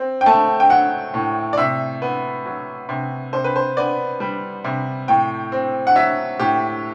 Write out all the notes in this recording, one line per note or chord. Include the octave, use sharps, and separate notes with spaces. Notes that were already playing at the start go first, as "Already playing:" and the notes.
Already playing: C4
G5
A3 A5
G5
F#3 F#5
A2
D5
C3 E5
B3
F#3
C3
C3 C5
B4
C5
B3 D5
G3
C3
A2 G5
C4
F#5
F#3 E5
A2 G4